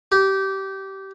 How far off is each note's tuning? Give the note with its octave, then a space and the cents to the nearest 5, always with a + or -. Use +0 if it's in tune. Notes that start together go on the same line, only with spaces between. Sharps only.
G4 -20